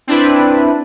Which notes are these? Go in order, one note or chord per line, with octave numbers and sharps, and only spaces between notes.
C4 D4 E4 B4